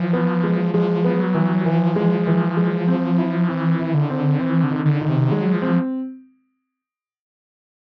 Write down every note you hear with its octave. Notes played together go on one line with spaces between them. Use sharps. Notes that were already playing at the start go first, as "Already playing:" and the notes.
Already playing: E3 F3
B3
G#3
F3 G#3
B3
F#3
E3
E3 F3
G#3
E3
G#3
C4
E4
E3 C4
E4
D3
C4
E3 C4
D3
D#3
D3
D#3
C3
F#3 G#3
F3
C4